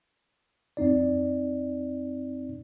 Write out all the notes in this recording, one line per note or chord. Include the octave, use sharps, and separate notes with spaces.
F2 C4 D#4 D5